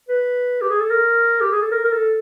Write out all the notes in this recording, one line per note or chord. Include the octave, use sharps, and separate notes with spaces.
B4
G4
G#4
A4
A#4
G4
G#4
A4
A#4
A#4
A4